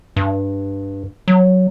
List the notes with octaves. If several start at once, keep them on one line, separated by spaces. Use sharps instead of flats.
G2
F#3